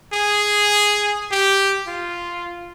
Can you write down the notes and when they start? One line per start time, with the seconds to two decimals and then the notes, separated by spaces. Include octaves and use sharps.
0.13 G#4
1.32 G4
1.88 F4